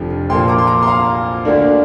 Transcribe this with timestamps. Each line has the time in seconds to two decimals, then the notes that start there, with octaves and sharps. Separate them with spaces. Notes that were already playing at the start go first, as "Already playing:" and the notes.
Already playing: F1 F2 D3 F3
0.29 A#1 A#2 F3 A#3 G5 C6
0.48 A#5 D6
0.58 C6
0.67 A#5 D6
0.83 C6
0.87 F5 A#5
1.45 D2 D3 A#3 D4